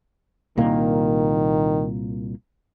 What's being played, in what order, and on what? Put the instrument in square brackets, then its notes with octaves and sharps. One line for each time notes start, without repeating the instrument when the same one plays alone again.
[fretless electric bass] C2 A#2 A#3 [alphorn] D#3